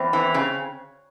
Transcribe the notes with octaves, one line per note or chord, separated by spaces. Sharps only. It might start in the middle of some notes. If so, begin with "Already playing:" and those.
Already playing: E2 C4
E3
C#3